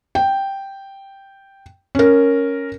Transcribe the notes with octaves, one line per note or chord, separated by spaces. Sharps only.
G5
C#4 A#4